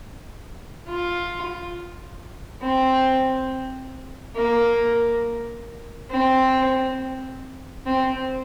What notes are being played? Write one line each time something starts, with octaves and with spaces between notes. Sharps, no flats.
F4
C4
A#3
C4
C4